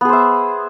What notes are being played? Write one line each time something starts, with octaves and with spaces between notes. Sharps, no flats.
B3 G#4 C5 E5